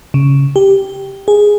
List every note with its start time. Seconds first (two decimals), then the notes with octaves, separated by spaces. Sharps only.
0.14 C#3
0.56 G4
1.28 G#4